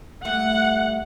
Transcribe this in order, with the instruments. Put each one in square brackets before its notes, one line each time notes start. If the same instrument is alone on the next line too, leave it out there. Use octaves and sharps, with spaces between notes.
[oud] G3 A3 [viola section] F#5